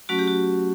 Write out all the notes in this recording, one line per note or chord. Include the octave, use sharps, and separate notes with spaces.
F#3 A3 C#4 F#4
G4
F#4